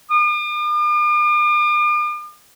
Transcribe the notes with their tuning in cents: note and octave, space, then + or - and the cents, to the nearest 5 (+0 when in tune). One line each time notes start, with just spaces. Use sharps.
D6 +45